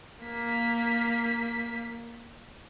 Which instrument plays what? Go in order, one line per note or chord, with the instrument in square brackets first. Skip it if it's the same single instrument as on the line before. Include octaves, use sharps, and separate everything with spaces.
[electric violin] A#3 B6